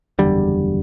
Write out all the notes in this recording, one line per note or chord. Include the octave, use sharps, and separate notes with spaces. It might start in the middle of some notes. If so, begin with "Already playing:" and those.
F#1 E2 D3 G3